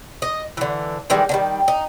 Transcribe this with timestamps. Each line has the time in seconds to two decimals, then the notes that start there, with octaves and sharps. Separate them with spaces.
0.22 D#5
0.57 D3 E3
1.10 D#3 E3 G3 G#3
1.29 D3 D#3 G3
1.68 D#4